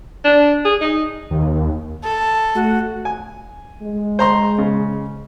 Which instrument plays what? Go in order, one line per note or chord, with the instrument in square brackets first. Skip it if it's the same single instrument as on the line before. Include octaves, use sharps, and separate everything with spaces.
[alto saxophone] D4
G#4
D#4
[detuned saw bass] D#2
[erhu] A4
[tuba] A3 [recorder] F#4
[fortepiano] G#5
[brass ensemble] G#3
[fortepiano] C5 A#5 C6
C#3